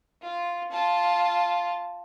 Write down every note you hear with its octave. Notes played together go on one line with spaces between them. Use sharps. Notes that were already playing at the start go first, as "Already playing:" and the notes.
F4
F4 A5